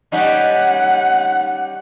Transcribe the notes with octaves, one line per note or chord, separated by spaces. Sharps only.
G3 C#4 D#4 F#5